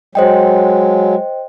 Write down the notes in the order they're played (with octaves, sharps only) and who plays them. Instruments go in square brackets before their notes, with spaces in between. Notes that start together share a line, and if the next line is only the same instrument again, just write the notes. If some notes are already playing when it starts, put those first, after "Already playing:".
[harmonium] F#3 G#3 [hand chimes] C5 D#5 G5